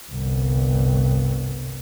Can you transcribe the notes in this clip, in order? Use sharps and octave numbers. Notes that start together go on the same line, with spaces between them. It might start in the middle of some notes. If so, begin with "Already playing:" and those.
G1 C2